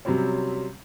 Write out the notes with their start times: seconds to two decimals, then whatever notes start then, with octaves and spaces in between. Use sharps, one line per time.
0.05 C3 F#3 G3 C4 C#4